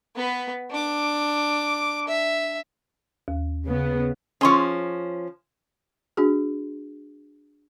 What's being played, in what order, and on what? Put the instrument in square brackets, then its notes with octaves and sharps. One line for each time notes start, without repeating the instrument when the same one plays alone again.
[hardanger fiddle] B3 B4
D4 D6
E5
[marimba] D#2
[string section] C#3 B3
[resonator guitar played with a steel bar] F3 C#4 [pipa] G#4 C6 C#6
[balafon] D4 F#4 G#4